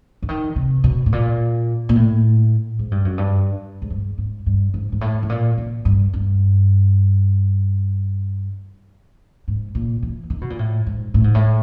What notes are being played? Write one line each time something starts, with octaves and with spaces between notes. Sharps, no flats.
D3
D#3
C3
B2
A2
A#2
A#2
A2
G#2
G2
F#2
G2
G#2
G2
G#2
G2
G#2
G#2
A2
A2
A#2
A#2
G2
G2
G#2
A#2
E3
D#3
B2
A#2
A2
G#2
A2
G#2
A2